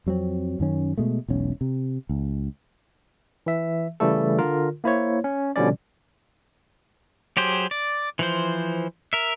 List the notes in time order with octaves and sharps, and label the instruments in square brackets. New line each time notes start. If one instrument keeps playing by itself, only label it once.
[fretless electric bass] F2 F#3 G#3 C4
F#2 D#3 C#4
B2 G#3 A3
E1 B1 C#4
C3
C#2
[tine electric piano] E3 E5
C#3 E3 G3 A3 A4
D3 F4 A#4
A#3 E4 C5 C#5
C#4
B2 D3 F3 G3 C#4 D5
[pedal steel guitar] F#3 G4 G#4 C5
D5
E3 F3 C5
A#4 E5